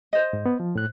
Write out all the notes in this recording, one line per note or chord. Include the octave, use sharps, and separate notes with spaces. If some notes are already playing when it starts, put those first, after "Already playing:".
C5 D#5
G#2
B3
F3
A2 F#6